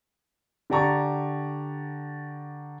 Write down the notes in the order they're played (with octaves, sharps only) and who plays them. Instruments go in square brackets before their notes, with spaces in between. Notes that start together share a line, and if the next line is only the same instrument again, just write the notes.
[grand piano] D3 G4 D5 A5 A#5 C#6